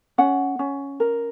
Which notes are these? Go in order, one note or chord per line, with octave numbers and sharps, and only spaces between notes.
C#4 F#5
C#4
A#4